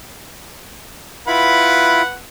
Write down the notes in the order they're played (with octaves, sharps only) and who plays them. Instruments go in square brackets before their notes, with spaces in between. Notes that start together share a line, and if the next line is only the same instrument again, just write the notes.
[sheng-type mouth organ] E4 F4 B5 [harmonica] B4 F#5